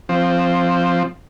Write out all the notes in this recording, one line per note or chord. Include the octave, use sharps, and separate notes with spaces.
F3 C4